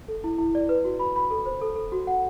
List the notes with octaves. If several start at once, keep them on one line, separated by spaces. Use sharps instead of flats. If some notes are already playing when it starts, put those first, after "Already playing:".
A4
E4
E4
D5
B4
F#4
B5
B5
A4
C5
A4
A4
F#4
F#5